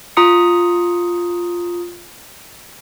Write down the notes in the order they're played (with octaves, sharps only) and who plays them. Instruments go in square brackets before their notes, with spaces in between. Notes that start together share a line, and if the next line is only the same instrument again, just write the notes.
[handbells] F4 A#5 D#6 C#7